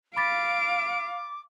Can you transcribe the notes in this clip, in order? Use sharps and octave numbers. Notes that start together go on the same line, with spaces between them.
F5 B5 D6 A6 B6 D7